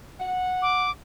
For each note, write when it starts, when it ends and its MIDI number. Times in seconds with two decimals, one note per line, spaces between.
0.20 0.86 78
0.62 0.90 86